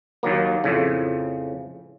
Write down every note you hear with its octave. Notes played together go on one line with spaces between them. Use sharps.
D#2 D#3 F#3 A#3
F2 A2 C#3